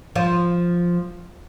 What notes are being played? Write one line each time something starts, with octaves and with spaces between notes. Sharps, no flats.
F3 F4